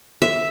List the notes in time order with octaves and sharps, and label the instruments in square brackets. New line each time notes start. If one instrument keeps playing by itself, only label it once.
[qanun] E5